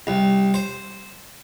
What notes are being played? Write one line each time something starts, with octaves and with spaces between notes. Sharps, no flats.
C2
C5